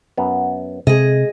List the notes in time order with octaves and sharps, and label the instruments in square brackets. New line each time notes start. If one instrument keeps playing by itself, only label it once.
[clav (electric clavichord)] F#2 B3
[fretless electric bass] C3 [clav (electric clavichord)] G#3 [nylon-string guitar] G#4 D#5